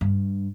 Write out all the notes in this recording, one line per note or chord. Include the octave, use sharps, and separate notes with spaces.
G2